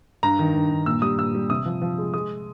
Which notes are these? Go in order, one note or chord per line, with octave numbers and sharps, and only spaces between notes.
G2 A#5
D#3
G2
G2
A#2 E6
G3 D#6
A#2 E6
G3
C3 D#6
F3
F3
G#3
G#3 D#6